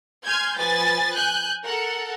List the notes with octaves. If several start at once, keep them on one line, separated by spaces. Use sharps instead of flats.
G#5 C6 F6 G6 G#6
F3 B4 G#5 A6
G#5 F#6 G6
A4 A#4 F#5